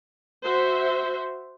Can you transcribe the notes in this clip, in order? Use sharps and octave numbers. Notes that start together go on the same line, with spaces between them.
F#4 C5 E5